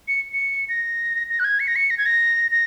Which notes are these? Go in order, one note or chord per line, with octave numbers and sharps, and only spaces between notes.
C#7
C#7
A#6
A#6
F#6
G#6
C#7
A#6
C#7
A#6
G#6
A#6
A#6